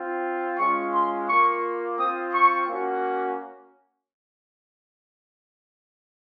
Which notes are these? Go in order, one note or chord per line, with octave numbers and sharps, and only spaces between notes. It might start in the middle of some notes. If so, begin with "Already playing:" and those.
Already playing: C4 F4
G#3 C#4 F4 C#6
C6
A#3 F4 C#6
C4 F4 D#6
C#6
A#3 C#4 F#4